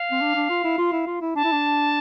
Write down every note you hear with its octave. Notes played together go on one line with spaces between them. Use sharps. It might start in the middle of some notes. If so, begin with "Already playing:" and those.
Already playing: F5
C4
D4
D4
F4
E4
F4
E4
F4
E4
D4 A5
E4
D4